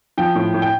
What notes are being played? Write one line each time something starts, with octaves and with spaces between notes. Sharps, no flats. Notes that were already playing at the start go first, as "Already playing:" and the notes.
F3 G5
A2
A2
G5